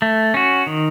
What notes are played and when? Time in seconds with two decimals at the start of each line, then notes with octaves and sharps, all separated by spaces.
0.02 A3
0.34 C#4 F#4
0.67 D#3